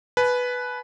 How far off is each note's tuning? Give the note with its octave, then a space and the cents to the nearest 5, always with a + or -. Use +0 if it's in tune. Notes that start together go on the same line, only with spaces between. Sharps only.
B4 +0 G#5 +45